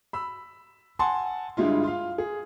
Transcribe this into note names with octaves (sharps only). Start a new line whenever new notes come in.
B5 E6
F#5 G#5 A5 C6
G2 D3 G3 G#3 E4 F4
F4 F5
G#4